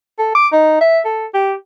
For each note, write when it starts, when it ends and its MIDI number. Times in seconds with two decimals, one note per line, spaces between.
0.19 0.34 69
0.35 0.48 86
0.52 0.76 63
0.81 1.00 76
1.05 1.26 69
1.34 1.54 67